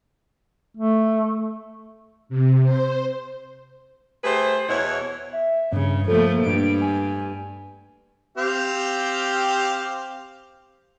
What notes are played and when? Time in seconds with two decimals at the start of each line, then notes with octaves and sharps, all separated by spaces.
0.77 A3
2.29 C3
2.63 C5
4.24 A3 G4 G#4 B4 C5
4.68 E2 B2 E4 C#5
5.33 E5
5.73 G2 C#3
6.08 F3 A3 A#3 A4
6.43 G2 D7
6.81 G#5
8.37 C4 G4 F5